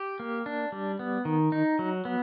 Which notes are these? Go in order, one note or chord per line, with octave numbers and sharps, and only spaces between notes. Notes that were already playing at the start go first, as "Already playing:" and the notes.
Already playing: G4
A#3
D4
G3
B3
D#3
D#4
F#3
B3